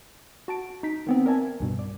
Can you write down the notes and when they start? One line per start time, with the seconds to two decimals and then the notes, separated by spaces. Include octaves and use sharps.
0.48 F#4 A5 D7
0.83 D#4 B6
1.07 D#3 B3 C4
1.26 A#4 D5 E5 G#5 A5 G#6
1.60 C2 G2 B2
1.79 D5